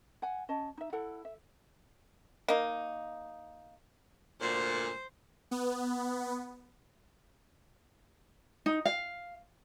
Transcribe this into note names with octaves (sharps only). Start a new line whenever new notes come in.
F#5 G#5
C#4 D#5 A5
D#4 E5
E4 A4 F#5
E5
A#3 D#4
D2 A#2 C5
B3
D#4
F5